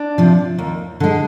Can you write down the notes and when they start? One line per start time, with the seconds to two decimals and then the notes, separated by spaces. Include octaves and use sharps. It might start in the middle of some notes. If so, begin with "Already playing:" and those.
Already playing: D4
0.18 C3 F3
0.58 D#2
1.00 D3 G#3